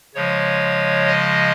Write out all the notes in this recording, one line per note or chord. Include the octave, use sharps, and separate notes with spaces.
C#3 F3 G#3 C#5
D#5